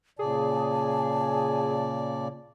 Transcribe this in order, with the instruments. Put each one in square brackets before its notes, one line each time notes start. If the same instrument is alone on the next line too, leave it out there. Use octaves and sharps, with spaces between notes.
[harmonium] A#2 C#3 D5 [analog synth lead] G#4 [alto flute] A5